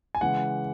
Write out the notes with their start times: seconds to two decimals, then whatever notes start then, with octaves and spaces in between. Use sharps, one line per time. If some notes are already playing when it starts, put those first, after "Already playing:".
0.15 G#5
0.21 C#3 E3 G#3 F#5